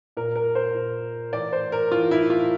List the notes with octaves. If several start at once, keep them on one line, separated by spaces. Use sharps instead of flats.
A#2 A#4
A#4
C5
A#2
A2 E3 D5
C5
A#4
A2 E3 F4
E4
F4